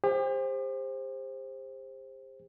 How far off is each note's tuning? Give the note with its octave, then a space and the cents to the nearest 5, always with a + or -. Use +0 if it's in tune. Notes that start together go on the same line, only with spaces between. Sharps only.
G4 +40 C5 +10